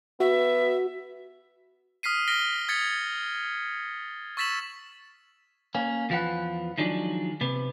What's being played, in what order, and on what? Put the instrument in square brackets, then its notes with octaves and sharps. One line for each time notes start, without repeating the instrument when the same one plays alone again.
[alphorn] B3 [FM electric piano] F#4 [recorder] E5
[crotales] D#6 F6 B6 C7 D#7
F6 A#6 B6 D7 G7
D#6 G#6 A6 B6 C#7
C#6 E6 A6 B6 E7 F#7
[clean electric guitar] A#3 C#4
E2 F3 F4 G4 B4 F#5
D#3 F3 F#3 G#3 D4
C3 B3